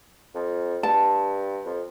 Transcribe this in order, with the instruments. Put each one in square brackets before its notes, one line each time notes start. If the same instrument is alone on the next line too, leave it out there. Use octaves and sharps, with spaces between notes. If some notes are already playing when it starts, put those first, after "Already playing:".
[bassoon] F2
[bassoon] G2 [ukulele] A5
[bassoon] F2